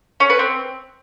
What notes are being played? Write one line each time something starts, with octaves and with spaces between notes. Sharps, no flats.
C#4
B4
C4